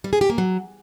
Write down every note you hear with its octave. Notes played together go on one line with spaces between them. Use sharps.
G3
G#4
G4
A#3
F#3